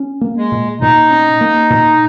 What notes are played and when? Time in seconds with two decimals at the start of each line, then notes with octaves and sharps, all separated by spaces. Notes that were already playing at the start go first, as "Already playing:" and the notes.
Already playing: C#4
0.21 A#3
0.37 G#3
0.52 A#2
0.81 A#2 D#4
1.11 C#4
1.41 A#3
1.70 A#2